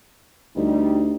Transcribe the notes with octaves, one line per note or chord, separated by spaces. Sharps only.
D2 G3 D#4